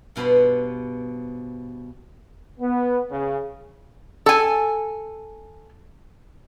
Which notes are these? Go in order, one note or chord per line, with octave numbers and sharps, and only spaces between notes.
G2 B2 B3 C5 B5
B3
C#3
A4 G#5